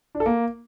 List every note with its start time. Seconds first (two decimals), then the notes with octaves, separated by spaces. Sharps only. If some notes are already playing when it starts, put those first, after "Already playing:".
0.15 D4
0.20 A4
0.26 A#3